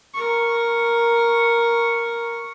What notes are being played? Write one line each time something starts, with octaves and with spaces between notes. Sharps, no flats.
A#4 C#6